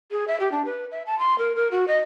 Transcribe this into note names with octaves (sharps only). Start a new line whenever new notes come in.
G#4
E5
G4
D4
B4
E5
A5
C6
A#4
A#4
F#4
D#5